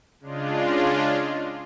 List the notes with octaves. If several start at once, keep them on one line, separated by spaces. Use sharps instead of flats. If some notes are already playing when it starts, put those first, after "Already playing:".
C#3 G#3 D4 F4